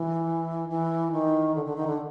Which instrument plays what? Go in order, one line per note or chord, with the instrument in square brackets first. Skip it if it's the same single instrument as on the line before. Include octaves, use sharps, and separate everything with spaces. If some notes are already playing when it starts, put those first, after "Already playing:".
Already playing: [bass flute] E3
E3
D#3
D3
D3
D#3
D3